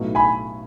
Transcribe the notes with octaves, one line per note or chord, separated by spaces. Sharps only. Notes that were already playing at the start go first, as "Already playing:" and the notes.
Already playing: B1 A2 F#3 B3 D#4
G#5 B5